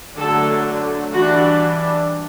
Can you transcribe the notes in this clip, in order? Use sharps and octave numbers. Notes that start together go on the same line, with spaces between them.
D3 F#3 A3 D4 A4
E3 G3 D4 F#4